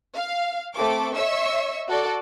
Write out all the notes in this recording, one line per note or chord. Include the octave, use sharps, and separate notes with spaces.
F5
A3 C4 A4 D6
C#5 D#5 E5 C#6 E6
F#4 A4 D5